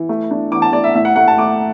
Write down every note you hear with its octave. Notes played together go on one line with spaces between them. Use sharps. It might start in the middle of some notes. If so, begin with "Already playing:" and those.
Already playing: E3
A3
D4
E3 D6
A5
A3 D5
E5
A2 E5
F#5
A3 F#5
A5
A3 D6